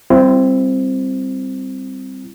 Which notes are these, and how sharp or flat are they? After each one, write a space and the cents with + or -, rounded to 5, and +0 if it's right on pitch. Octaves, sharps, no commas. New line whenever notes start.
G3 +0 C4 +0 E4 +35